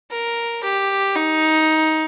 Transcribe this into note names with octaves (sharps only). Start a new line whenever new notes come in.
A#4
G4
D#4